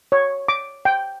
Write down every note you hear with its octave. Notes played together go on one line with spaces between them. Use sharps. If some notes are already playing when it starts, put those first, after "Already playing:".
C#5
D6
G5